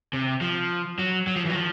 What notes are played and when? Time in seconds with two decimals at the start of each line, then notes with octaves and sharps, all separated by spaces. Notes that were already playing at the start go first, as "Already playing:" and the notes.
0.13 C3
0.41 F3
0.98 F#3
1.27 F#3
1.36 F3
1.45 E3
1.50 F#3
1.55 F3